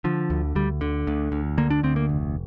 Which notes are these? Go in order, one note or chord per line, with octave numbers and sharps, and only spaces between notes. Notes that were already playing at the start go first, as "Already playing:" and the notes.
D3 F3
D2
D2 G3
D3
D2
D2
D3 A#3
D4
D2 C4
A#3
F1